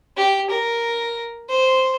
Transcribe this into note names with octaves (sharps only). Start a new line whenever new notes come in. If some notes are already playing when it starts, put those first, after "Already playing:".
G4
A#4
C5